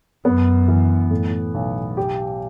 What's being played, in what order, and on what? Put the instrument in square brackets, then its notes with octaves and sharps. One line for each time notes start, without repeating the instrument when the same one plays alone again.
[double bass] F#2 [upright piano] B3
[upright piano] E3
A2
B1
G4